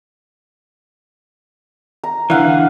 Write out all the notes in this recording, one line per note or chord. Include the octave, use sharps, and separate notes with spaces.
A#5
D3 E3 F5 F#5